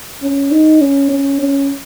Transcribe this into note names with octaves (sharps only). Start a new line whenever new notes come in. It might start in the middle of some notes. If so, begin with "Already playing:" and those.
C#4
D#4
C#4
C#4
C#4